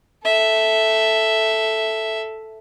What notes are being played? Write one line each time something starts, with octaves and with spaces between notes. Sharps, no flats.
A4 E5